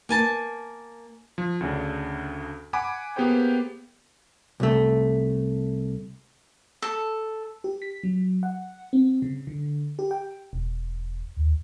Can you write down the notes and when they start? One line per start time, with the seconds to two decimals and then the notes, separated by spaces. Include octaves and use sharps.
0.09 A#3 G#5 A5
1.38 F3
1.61 D2 C#3 D4
2.73 F#5 G#5 B5 D6
3.16 A#3 B3 G4 G#4 C5 G5
4.60 C2 A3
6.82 A4
7.64 G4
7.82 B6
8.03 F#3
8.43 F#5
8.93 C4
9.22 C#3
9.47 D3
9.99 G4
10.11 G5
10.53 E1
11.36 D#2